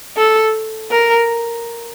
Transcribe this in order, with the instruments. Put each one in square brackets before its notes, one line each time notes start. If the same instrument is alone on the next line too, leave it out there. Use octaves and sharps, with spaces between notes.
[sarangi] A4
A#4